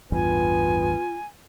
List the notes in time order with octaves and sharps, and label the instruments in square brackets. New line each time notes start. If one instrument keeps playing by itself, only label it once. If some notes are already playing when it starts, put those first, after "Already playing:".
[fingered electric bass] A1 E2 G2 [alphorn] B3 [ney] F4 [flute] G#5